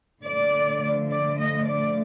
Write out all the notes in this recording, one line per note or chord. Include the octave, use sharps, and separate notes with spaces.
D3 F3 A3 D5
D5
D#5
D5